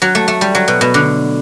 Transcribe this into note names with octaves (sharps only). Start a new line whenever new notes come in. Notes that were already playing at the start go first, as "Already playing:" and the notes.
F#3
A3
A3
G3
F#3
B2
B2
D3